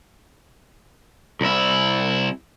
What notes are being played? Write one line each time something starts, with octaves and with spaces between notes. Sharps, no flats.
C2 E4